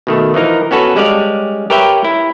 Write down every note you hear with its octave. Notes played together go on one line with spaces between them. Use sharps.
B2 D#3 A3
E3 F3 D#4 A#4
B3 C#4 F#4 A4 B4
G3 G#3 C#4 D5 F5
G4 A#4 B4 C#5 E5 G5
E4